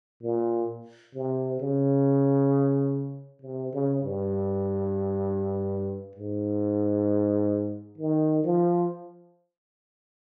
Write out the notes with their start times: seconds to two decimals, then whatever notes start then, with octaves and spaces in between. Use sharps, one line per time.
0.23 A#2
1.15 C3
1.60 C#3
3.42 C3
3.73 C#3
4.03 G2
6.16 G#2
7.98 D#3
8.44 F3